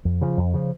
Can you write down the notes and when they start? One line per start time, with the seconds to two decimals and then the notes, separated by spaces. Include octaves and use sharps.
0.05 F2
0.21 C#3 F3
0.37 F2
0.54 C#3 F3